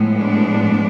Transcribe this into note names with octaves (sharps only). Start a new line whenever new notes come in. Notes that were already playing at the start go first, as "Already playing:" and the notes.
Already playing: A2 F3 G#3 B3
D4